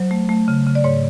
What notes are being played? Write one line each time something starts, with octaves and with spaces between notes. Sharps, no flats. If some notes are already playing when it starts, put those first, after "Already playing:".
Already playing: F#3 C5
A3
A3
C#3
C#3
D5
G#2 C#5